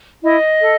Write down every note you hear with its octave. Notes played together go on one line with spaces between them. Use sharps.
E4 D#5
A4